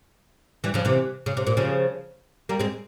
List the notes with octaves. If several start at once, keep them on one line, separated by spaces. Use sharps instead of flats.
E3 G3
C#3 F3
C3 E3
C#3
C3
A#2
C#3 F3
G3 A#3
G#3 C4